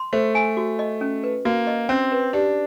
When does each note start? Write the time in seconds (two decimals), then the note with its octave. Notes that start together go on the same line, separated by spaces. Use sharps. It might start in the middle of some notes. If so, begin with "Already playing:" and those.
Already playing: C6
0.13 A3 C5
0.35 G#5
0.57 F#4
0.79 D#5
1.01 C#4
1.24 B4
1.45 A#3 F#4
1.67 D#5
1.89 C4 C#4
2.12 B4
2.33 D4 G4